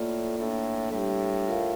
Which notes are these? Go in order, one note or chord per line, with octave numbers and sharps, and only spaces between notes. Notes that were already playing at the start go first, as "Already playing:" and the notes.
Already playing: A2 A#3 F4 A4 D5
A2 A#3 D4 A4
A2 G3 D4 G4
F4 A#4 F5